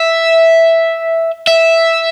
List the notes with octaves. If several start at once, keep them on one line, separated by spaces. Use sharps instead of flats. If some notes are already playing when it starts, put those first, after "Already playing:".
Already playing: E5
E5